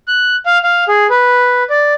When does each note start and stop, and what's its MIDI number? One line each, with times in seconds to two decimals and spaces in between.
0.08 0.36 90
0.46 0.58 77
0.64 0.84 77
0.88 1.07 68
1.10 1.63 71
1.70 1.94 74